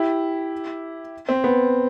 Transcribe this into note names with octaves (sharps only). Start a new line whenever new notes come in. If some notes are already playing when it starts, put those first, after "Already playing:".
Already playing: E4 G4
C4
B3